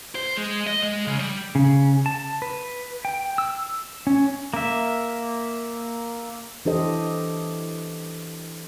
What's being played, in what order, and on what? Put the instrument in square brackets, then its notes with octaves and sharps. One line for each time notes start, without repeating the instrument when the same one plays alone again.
[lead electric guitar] C5
G#3
D#5
G#3
C#3
G3
[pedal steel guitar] C#3
A5
B4
G5
E6
C#4
A#3 E5
[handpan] E3 D4 G4 A4 C5 D#5